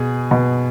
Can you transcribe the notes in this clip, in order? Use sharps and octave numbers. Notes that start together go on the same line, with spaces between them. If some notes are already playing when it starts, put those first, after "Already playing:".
Already playing: B2 G#4
B2